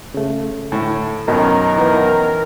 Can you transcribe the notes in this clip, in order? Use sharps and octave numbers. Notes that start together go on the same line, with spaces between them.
C#3 A3
D2 A2
F#2 B2 D#3 B3 A#4
E3 B3